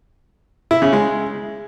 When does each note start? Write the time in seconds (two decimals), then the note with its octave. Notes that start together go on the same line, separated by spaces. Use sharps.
0.71 E4
0.82 C#3
0.93 G#3